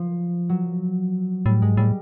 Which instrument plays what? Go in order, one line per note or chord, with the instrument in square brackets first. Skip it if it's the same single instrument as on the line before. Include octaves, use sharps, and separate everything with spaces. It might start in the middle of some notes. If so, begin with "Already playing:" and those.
Already playing: [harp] F3
F#3
[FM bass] A2 [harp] G3
[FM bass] G#2 [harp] G#3
[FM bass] A2 [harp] G3